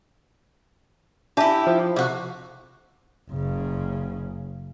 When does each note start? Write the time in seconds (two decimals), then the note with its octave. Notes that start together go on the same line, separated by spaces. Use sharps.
1.37 D4 E4 G4 E5 A5
1.67 F3
1.96 C3 F#4
3.31 F#1 C#3